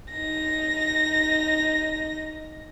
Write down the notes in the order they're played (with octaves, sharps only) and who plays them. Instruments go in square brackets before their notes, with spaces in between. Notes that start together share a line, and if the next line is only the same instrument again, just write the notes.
[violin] D#4 A#6